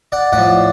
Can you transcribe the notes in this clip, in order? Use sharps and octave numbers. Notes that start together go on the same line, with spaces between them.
D5 F#5
A2 F3 D5 F#5